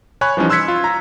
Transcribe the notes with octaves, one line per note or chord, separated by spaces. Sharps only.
C#5 G#5 B5 C#6 F#6
E3 F3 G3 C#4 D#4
C6 E6 F#6 G#6 B6 C#7
F4
A#5